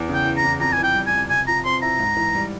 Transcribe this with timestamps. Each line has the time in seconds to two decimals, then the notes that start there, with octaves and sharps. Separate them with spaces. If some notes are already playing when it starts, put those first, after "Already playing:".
Already playing: E2
0.09 C#3
0.14 G5
0.25 E3
0.37 A#5
0.44 E2
0.60 F2 A#5
0.73 G#5
0.79 E3
0.84 G5
0.95 G3
1.07 G#5
1.12 F2
1.30 C3 G#5
1.47 F3 A#5
1.65 C4 C6
1.82 E4 A#5
1.99 G#2
2.17 E3
2.35 G3